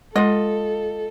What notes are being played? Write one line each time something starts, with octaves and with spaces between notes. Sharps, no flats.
G#3 F4 A4 D#5